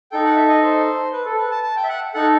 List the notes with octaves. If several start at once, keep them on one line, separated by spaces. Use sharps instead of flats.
D#4 A4 G5
F#5
E5
D#5
C5
B4
A4
B4
A5
A5
G5
E5
F#5
D#4 A4 F#5